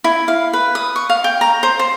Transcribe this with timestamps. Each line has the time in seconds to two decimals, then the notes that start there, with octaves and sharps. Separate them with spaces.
0.04 E4
0.28 F5
0.53 B4
0.75 D#6
0.96 C#6
1.10 F5
1.24 G5
1.41 A#5
1.63 C5
1.79 C5